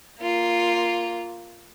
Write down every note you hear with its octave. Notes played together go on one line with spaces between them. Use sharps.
A#3 F4